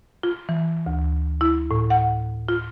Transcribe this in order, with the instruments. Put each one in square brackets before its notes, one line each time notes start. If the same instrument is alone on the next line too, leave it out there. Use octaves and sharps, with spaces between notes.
[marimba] F4
E3
D2
E4
A2
F#5
F4